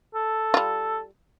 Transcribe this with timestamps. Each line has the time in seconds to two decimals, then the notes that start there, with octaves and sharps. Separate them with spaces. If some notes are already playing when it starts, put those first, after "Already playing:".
0.15 A4
0.54 G3 F4